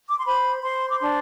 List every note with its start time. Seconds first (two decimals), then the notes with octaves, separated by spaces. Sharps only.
0.10 D6
0.18 C6
0.25 C5 B5
0.63 C5 C6
0.90 D6
1.00 D4 C6